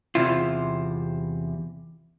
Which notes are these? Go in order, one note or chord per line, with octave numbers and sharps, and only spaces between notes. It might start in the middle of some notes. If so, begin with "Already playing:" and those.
E2 C3 E4 F4